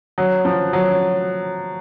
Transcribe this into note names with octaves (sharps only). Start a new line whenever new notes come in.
F#3
F3
F#3